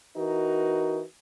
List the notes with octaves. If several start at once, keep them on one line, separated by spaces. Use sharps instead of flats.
E3 D#4 F#4 A#4